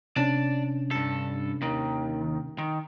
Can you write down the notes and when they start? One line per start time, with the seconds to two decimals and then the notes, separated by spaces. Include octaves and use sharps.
0.16 C3 C#4 D4 D5 A5
0.91 G2 A4
1.62 D#2 D#3
2.58 D#3